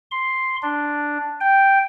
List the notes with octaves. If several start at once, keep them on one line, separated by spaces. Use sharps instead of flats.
C6
D4
G5